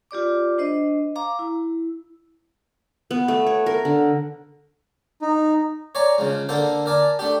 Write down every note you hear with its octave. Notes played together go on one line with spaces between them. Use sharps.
F4 G4 D5 D6
D4 C5 D#5
F5 A#5 D6
E4
B3
A3
C#5
A#4
D3
D#4
C#5 D5 G#5 A#5
C#3 F3 G#3
D3 A#3 A4 C5
A#4 D5 G#5 A5
A3 D4 G4